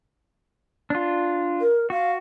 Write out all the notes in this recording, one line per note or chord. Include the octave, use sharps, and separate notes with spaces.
D4 F4
A#4
F#4 F5